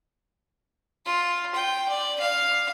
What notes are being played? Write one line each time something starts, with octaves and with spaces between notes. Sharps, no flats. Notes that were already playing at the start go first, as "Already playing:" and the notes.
F4
G5
D5
F5